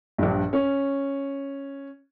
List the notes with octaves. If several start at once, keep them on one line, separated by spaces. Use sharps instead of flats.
A#1 G2
C#4